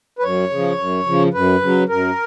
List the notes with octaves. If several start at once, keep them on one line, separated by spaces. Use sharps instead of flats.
B4
F#2 C#5
C#3 F3
F#2
C#3 F3
F#2 B4
C#3 F#3
F#2 A#4